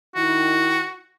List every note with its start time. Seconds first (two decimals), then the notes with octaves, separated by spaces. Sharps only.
0.15 D#3 E4 F#4